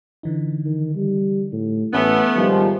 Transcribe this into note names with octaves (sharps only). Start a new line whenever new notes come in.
D3 E3 D#4
D#3
G3
A2
A1 A3 B3 C#4 G#5
G#2 D#3 F3 G3